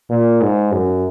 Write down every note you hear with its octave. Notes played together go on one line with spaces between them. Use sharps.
A#2
G#2
F#2